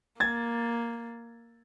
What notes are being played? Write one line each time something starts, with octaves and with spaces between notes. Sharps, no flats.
A#3 G#6 A6